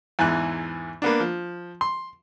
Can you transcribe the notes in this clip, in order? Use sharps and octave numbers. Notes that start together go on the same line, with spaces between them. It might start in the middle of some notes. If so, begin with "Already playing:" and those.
E2 G#2 E3 F#6
A#3 B3 D4
F3
C6